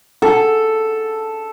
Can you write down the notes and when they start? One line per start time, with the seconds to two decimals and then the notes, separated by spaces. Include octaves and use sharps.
0.22 A4